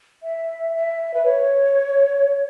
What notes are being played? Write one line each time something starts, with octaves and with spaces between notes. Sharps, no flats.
E5
E5
B4
C#5